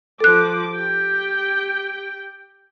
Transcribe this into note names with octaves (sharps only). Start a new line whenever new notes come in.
F3 A4 D6 F#6
G4 G5